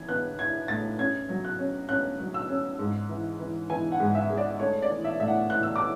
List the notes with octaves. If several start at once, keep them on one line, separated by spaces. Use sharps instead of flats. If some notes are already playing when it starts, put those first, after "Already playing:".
Already playing: E3 G#6
B3 F#6
E4 G#6
A2 A6
C#4 G#6
F#3
F#6
C#4
C#4 F#6
F#3
E6
C#4
G#2
E3
E3
E3 G#5
F#5
G#2
E5
G#3
D5
A3 C#5
D5
E3
E5
A2 E5
F#5
E3 F#6
E6
E3 D6